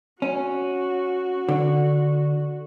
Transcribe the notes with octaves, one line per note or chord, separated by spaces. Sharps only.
C#4 F#4
D3